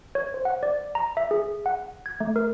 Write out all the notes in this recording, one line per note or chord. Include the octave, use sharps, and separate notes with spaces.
C#5
C5
F#5
D5
A#5
E5
G#4
F#5
G#6
A3
A#4